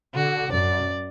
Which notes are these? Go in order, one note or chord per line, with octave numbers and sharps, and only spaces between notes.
D3 F#4
F#2 D5